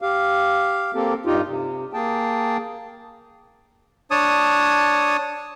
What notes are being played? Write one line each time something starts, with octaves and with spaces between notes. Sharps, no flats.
G4 F5
A#3 C4 G4 A4
G2 D#4 F4 G4
C3
A#3 G#4 G5 A5
D4 C#5 A5 D#6